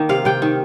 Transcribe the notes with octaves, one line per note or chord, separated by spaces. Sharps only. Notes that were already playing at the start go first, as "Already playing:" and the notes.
Already playing: D#3 A#3
C3 F5
C3 G5
D#3